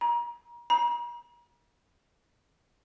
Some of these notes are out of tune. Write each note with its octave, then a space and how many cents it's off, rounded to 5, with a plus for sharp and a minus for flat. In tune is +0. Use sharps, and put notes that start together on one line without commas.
A#5 +35
A#5 +45